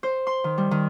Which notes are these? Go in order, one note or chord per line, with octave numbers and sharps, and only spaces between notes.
C5
C6
D#3
G3
D#3